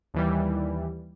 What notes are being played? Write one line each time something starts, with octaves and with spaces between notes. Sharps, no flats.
D#2 E3 G3